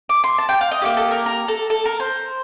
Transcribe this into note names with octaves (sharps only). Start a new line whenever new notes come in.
D6
C6
A5
G5
F5
D#5
A#3 D#4 G4
A4
A#4
A#4
A4
A4
A#4
C5